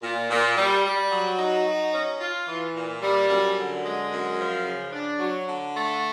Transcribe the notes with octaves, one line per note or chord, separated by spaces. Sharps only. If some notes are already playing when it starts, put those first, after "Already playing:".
A#2
A#2
G3
G3
F#3
D#4
F#3
C#4
F4
E3
A#2
G3
F#2
D3
G#3
F#2
F3
C#3
D4
F#3
D3
A3